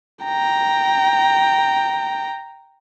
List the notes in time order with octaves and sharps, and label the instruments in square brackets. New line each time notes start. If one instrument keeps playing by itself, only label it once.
[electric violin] G5 A#5